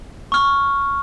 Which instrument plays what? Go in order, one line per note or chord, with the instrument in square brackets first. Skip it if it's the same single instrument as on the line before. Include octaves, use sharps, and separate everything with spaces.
[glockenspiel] C#6 F6